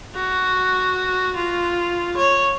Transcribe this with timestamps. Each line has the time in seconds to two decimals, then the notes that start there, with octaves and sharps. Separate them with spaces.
0.16 F#4
1.36 F4
2.17 C#5